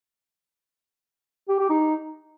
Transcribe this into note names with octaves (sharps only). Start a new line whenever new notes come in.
G4
G4
D#4